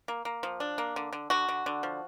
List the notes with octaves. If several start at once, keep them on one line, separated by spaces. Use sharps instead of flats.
A#3
A#3
F3
D4
A#3
D3
D3
D3 F#4
D3
D3
F3